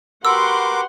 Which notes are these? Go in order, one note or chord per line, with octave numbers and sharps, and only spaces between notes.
F#4 G4 A#4 B4 F#5 C6 D6 E6